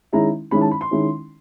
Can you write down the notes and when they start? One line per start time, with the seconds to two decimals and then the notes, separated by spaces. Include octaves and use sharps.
0.12 D#3 G#3 C#4 E4 A#5
0.51 D#3 G#3 C#4 E4 B5
0.61 A5
0.71 B5
0.81 C6
0.91 D#3 G#3 C#4 E4